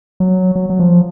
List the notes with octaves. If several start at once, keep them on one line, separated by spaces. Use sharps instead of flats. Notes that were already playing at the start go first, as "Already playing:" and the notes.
F#3
F#3
F#3
F3